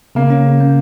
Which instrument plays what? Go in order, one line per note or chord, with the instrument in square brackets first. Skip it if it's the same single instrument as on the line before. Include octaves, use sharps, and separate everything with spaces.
[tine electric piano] C#3 [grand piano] A#3
[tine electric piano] C#4
C#3
A#3